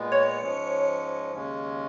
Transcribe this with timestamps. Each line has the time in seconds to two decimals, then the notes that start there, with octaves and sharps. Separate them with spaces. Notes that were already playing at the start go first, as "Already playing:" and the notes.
Already playing: A#2 G#3 B3
0.12 C#5
0.42 G#2 F3 G#3 C#4
1.33 D#2 C#3 G#3 C#4